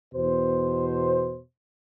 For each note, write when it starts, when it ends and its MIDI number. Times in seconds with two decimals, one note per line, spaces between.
0.14 1.39 40
0.14 1.39 47
0.14 1.39 72